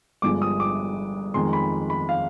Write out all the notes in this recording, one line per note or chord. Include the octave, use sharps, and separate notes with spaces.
G1 G2 F3 G#3 D6
D#6
D6
F2 D#3 G#3 C6
B5
B5
F5